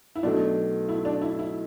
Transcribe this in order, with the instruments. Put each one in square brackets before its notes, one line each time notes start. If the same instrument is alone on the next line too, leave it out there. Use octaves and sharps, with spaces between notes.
[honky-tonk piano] E4
[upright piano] B1 B2 A3 [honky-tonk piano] D4
[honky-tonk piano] E4
D4
E4
E4